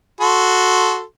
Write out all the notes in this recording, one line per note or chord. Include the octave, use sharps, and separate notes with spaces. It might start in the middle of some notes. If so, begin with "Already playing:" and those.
F#4 A4 C6